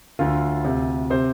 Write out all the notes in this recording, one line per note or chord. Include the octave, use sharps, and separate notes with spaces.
D2 D3 F4
D2 C3
C3 C5